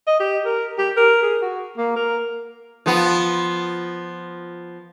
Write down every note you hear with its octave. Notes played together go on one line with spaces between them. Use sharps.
D#5
G4
A#4
G4
A#4
G#4
F#4
A#3
A#4
F3 B3